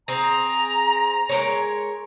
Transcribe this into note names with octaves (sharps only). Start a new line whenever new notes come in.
C4 G#4 A#5
G#3 A#4 C#5